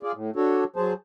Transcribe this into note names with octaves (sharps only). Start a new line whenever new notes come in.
F4 G#4 D5
A2
D4 F#4 A4 C#5
F#3 G#4 C5 A5